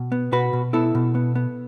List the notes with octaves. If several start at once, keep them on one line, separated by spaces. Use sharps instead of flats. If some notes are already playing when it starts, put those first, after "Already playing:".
Already playing: B2
B3
B2 F#4 B4
B2
B3 E4 A4
B2
B3
B3